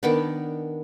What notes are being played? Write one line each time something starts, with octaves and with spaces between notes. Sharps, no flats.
D#3 B3 D4